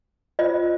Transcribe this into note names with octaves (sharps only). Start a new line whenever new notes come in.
F4 C5 D#5